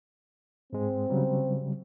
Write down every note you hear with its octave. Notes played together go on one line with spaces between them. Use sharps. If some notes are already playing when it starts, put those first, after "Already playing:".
G#2 G#3 C4
C#3 F#3 G3